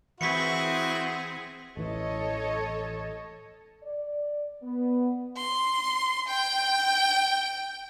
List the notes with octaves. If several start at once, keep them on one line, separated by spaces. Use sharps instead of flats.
E3 C4 E4 F#4 G#4 B6 C#7
A1 E3 A4 C#5 D#5
D5
B3
C6
G5 D7